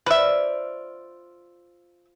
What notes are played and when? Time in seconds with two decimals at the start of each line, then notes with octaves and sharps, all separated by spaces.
0.06 F4 B4 C5 D5 E5